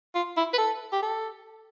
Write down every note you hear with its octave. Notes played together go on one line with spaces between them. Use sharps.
F4
E4
B4
A4
G4
A4